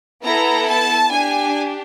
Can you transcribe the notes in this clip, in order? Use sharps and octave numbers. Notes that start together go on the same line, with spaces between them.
B3 E4 A4 A#5
A5
D4 G4 G#5